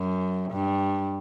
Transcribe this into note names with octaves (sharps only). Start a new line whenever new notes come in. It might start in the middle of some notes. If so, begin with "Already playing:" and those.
Already playing: F#2
G2